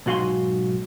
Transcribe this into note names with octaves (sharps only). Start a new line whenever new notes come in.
B1 G#2 F#4 F5 G#5 C6